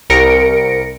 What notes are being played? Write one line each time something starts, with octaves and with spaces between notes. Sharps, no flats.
C2 A#4 A#6 C#7 D7